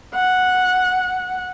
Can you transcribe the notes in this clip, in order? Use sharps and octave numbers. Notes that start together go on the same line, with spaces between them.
F#5